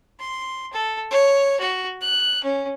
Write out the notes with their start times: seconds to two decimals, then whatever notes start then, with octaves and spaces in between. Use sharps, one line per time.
0.20 C6
0.73 A4
1.11 C#5
1.60 F#4
2.01 F#6
2.43 C#4